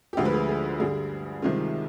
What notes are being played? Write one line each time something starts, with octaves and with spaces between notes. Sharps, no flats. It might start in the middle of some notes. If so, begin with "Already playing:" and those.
G4
D2 D3 F3 G#3 F4
B4
G#4
G#4
G2 D3 G3 G#4
C2 C3 D#3 G#3 F4